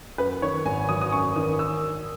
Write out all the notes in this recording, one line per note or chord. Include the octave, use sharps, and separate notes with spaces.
F#2 B4
D#3 C#5
G#1 G#5
F#3 D#6
D#6
F#2 C#6
D#3 D#6
D#3 E6